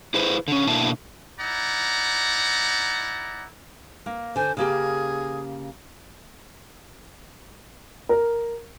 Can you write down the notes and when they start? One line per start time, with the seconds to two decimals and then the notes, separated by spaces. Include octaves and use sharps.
0.14 E4 G#4 B4 C5
0.48 D3 C#4
0.67 B2 A#3 D4 E4 A5
1.40 D#4 E4 D5 F#5 A#5
4.06 A#3
4.36 D3 C5 G#5
4.57 C#3 A#3 G4 G#4
8.09 A#4